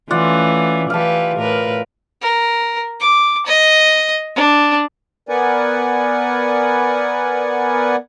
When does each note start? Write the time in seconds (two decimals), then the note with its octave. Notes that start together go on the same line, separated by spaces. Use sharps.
0.11 E3 A3 C#4 F4 D5 F#5
0.90 E3 G4 B4 F5 A5
1.37 A2 A#4 B4
2.21 A#4
3.00 D6
3.46 D#5
4.36 D4
5.29 B3 A#4 B4 D5 F#5 G#5